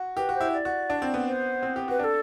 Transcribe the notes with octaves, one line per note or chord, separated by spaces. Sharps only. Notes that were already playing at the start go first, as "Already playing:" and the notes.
Already playing: F#4
G4 B4
F#4
C5
E4
D5
F#4
D4
C4
B3
C5
C4
G4
F#4 B4
D4 A4 B4